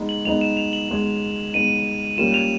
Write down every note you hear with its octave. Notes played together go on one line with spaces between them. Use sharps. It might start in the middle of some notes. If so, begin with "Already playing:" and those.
Already playing: G#3 B3 D#4
F#7
G#3 B3 D#4 F7
E7
F7
F#7
G#3 B3 D#4
G#3 B3 D#4 D#7
G3 A#3 C#4 F4 E7
F7